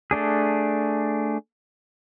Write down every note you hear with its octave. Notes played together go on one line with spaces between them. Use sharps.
A3 D4 G#4